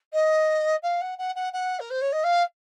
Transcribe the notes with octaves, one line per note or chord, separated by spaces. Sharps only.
D#5
F5
F#5
F#5
F#5
F#5
A#4
C5
C#5
D#5
F5